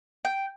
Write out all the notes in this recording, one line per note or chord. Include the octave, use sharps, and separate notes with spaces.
G5